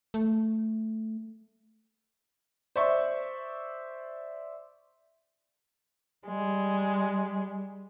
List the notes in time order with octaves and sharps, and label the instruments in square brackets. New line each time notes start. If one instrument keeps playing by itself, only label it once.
[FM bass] A3
[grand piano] C5 D5 E5 C#6
[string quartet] G3 G#3